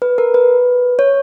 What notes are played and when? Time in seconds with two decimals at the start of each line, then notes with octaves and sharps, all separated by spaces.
0.02 B4
0.18 A#4
0.34 B4
0.99 C#5